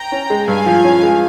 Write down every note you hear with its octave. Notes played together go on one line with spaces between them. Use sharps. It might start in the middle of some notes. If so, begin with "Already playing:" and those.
Already playing: G5 A#5
C#4
G#3
G2 F5 G#5
F3
C#4
G#3